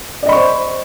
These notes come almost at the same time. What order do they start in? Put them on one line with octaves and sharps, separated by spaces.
D5 D#5 B5 C#6 C5